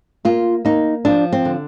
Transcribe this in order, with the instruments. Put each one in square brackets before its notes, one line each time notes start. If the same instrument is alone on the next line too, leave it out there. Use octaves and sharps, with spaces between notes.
[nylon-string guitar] A#3 F4
A#3 D#4
F3 D4
C4
D3